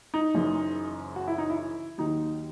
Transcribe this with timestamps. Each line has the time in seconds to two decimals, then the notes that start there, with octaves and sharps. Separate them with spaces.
0.14 D#4
0.34 F#1 F#2 E3
1.16 F#4
1.27 E4
1.38 D#4
1.50 E4
1.98 D#2 D#3 F#3 D#4